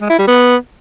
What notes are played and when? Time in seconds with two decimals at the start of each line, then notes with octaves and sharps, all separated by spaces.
0.01 G#3
0.10 E4
0.19 G3
0.28 B3